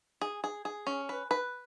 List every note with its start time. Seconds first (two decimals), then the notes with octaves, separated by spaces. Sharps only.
0.21 G#4
0.44 G#4
0.65 G#4
0.87 C#4
1.09 B4
1.31 B4